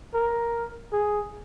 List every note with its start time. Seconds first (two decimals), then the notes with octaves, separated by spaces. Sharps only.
0.14 A#4
0.92 G#4